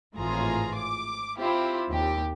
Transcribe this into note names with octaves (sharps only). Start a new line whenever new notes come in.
G#1 A2 E3 F4 G#4 A#5
D6
C4 E4 F4 G4
D#2 G4